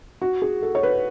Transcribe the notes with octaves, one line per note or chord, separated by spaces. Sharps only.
F#4
G#4
A4
C#5
B4